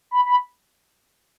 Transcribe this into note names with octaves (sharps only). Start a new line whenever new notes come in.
B5
B5